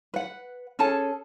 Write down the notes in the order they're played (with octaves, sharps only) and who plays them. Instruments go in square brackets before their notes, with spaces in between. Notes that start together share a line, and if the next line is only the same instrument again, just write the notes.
[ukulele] B4 F#5
C#4 G#4 A4 A5